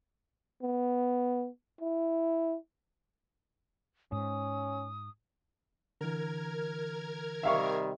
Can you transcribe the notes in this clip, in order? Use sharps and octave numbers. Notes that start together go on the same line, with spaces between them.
B3
E4
G#2 C#4 D#6
D3 E3 A#4 F6 G#6
C3 D#3 G3 E5 F5 C#6